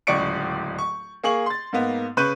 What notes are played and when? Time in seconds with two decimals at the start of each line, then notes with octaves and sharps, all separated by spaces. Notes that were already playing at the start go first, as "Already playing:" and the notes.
0.07 D1 C#2 D5 C#6 C#7 D7
0.79 C#6
1.24 A#3 G#4 C#6 F#7
1.46 C6 A6
1.73 G#2 A#3 B3
2.17 C#3 B4 C#6 F#6 G6 D#7